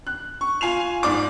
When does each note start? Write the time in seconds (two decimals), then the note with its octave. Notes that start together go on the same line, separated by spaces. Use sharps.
0.07 F#6
0.41 C#6
0.61 F4 G#5 C7 F7
1.03 G#2 D5 D6